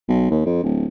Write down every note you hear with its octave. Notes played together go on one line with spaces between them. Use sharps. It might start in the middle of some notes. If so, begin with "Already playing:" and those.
B1
D#2
F2
D1